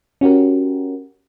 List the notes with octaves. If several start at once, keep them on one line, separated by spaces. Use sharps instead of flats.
C#4 F#4 G4 A#4